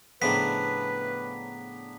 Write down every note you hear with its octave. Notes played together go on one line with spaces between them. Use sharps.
A2 C#3 F3 B3 D4 B4 A#5 B6